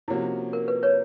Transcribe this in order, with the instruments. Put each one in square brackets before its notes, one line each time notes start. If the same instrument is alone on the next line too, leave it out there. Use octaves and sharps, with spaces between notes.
[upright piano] C3 F3 A#3 C#4 F#4 [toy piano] E4
[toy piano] A#4
B4
B4 C#5